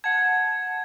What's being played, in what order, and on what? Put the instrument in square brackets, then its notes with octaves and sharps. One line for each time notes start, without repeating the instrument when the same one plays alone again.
[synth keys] F#5 A5 [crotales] G#6